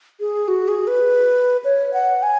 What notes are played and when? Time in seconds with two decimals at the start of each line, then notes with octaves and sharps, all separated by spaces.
0.20 G#4
0.48 F#4
0.68 G#4
0.87 B4
1.64 C#5
1.93 F#5
2.23 G#5